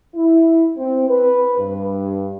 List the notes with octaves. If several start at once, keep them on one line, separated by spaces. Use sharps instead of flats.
E4
C4
B4
G2